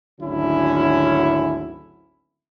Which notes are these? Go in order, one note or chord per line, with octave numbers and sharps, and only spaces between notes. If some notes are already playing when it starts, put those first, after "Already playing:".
G#1 D2 D3 F#3 C#4 E4